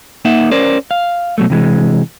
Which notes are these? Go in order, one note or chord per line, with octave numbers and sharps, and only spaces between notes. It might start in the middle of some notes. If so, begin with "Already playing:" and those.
A#3 D#4 E5 F#5
C#4 A#4 C5 D5
F5
B2 F#3 A3
C3 E3 G#3